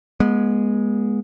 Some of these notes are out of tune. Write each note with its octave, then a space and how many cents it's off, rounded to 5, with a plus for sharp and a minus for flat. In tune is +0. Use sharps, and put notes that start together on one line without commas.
G#3 +0 B3 -35